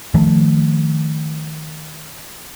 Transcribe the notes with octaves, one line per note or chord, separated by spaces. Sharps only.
D#3 F3 A3